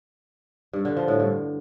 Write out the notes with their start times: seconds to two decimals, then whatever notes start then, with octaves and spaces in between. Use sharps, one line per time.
0.73 G2
0.85 D3
0.97 F3
1.08 A2
1.20 G2